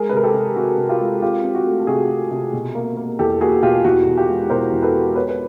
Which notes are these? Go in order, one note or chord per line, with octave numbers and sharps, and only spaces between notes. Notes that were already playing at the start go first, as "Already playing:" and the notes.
Already playing: G#3 G#4 A#4
B4
C3 A#4
G4 A4
C3
C3 F#4
C3
F4 G4
G#3
C4 F4 G4
C4
F#4
A3
A4
C3 F#4 G#4
C3
C3
B2
A#3
A#3
E2 G4 A4
A#3 F#4 G#4
B2 F4 G4
E2 F#4
B2
F4 G4
G#3
B2 A#4 C5
E2
A4 B4
G#3
B3 B4 C#5
B4